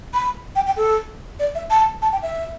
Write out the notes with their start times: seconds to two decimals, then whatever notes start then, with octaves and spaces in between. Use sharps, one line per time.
0.14 B5
0.56 G5
0.67 G5
0.77 A4
1.39 D5
1.55 E5
1.71 A5
2.02 A5
2.12 G5
2.23 E5